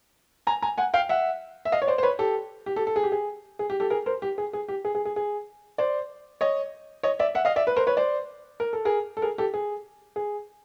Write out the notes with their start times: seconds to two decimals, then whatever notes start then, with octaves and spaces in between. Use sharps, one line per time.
0.47 G#5 A#5
0.62 G#5 A#5
0.78 F#5 G#5
0.94 F5 G5
1.09 E5 F#5
1.65 E5
1.72 D#5 F5
1.82 C#5
1.87 C5 D5
1.98 C5
2.03 B4 C#5
2.19 G4 A4
2.66 G4
2.76 G4 A4
2.87 A4
2.96 G#4
3.03 G4
3.12 G#4
3.59 G#4
3.70 G4
3.80 G4 A4
3.90 G#4 A#4
4.06 A#4 C5
4.22 G4
4.38 G#4
4.53 G#4
4.68 G4
4.85 G#4
4.95 G#4
5.05 G#4
5.16 G#4
5.78 C5 D5
6.41 C#5 D#5
7.03 C#5 D#5
7.19 D5 E5
7.35 E5 F#5
7.45 D#5 F5
7.56 D5 E5
7.67 B4
7.76 A#4 C5
7.87 B4 C#5
7.97 C5 D5
8.60 A#4
8.73 A4
8.85 G#4 A#4
9.17 A4
9.22 G#4 A#4
9.38 G4 A4
9.54 G#4
10.16 G#4